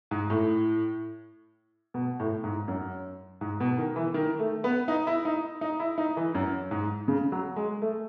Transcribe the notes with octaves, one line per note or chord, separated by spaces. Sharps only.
G#2
A2
B2
A2
G#2
F#2
G#2
B2
D#3
E3
D#3
A3
B3
D#4
E4
D#4
D#4
E4
D#4
E3
F#2
G#2
C#3
F#3
G#3
A3